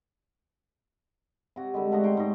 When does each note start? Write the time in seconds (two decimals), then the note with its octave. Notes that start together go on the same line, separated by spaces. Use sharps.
1.56 C3 F#4
1.74 D3 G3 G#3
1.92 A3 F#4 D#5 F#5
2.03 C#5 G5 C6
2.17 G#2 D#5